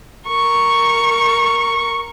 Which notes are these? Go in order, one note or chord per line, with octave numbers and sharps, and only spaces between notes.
A#4 C#6